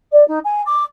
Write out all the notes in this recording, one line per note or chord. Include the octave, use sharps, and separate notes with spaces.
D5
D#4
G#5
D6